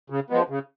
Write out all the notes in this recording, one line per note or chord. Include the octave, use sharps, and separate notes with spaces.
C#3
F3 G#3 B3
C#3